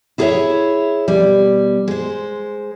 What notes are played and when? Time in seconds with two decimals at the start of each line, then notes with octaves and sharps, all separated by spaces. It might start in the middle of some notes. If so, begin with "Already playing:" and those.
0.18 E4 G#4 A4 B4 C#5 E5
1.08 B2 G3
1.88 G#3 C5